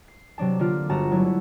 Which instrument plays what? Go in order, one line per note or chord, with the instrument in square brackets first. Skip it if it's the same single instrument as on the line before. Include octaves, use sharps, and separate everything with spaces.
[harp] C7
C3 F#3 D4 A5
D3 A#3 D4 F4
G1 F#4 F#5 A5 A#5 A#6
F#3 A3 E4